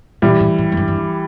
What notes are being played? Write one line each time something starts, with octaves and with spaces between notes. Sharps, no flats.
A#2 E3 G3
A2
A2
F2
G2
G2
F2